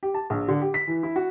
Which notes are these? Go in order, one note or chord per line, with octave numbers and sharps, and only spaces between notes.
G4
A5
A#1
D3
G4
B6
E3
E4
F#4